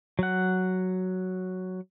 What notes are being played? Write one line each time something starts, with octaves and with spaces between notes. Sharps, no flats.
F#3 F#5